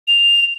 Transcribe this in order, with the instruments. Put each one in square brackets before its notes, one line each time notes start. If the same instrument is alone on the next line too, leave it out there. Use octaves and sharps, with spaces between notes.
[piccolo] F7